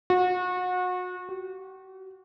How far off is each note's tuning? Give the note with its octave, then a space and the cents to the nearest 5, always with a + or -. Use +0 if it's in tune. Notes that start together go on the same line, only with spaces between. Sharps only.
F#4 -30
F#4 +45